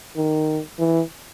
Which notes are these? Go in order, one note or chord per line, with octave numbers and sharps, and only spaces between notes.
D#3
E3